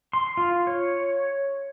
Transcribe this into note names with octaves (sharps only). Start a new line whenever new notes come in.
C6
F4
C#5